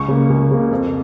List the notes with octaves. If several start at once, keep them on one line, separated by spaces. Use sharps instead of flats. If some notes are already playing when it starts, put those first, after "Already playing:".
Already playing: C#2 C#6
C#3 A#3
C#2
C#3 A#3
F2